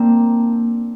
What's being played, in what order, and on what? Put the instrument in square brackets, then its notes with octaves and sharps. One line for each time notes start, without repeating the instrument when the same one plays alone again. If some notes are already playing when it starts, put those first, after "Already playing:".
Already playing: [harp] A#3 C4 D4